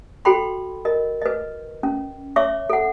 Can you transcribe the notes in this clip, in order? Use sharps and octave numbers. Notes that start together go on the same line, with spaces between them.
F#4 A4 G5 B5 C6
A#4 D#5
B4 D#5
C#4
C#5 E5 C#6 D6
A4 F#5